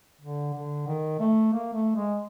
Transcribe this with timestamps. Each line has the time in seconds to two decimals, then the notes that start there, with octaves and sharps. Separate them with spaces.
0.21 D3
0.54 D3
0.87 D#3
1.20 A3
1.53 A#3
1.74 A3
1.96 G#3